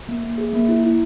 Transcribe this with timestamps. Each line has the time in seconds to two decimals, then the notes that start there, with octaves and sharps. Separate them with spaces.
0.08 A#3
0.24 A#3
0.38 G#4
0.53 A#3
0.69 E4
0.84 E4